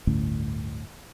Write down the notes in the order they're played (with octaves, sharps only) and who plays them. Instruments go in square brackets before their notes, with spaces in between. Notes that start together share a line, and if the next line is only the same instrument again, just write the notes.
[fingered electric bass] G1 D2 A2 C#4